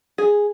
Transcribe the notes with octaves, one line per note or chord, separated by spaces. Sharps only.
G#4